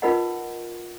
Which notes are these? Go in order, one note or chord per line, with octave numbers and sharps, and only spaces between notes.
D#4 F4 A#4 B4 D#5 F#5